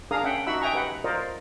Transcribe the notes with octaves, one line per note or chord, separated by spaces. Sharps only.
D4 G#4 A#4 F5 A#5 D#6
C#4 E5 F#5 G5
D#4 F#4 E5 F#5 B5 E6
D#5 E5 G5 G#5 A#5 C#6
G4 B4 F#5
F4 A#4 C5 D5 D#5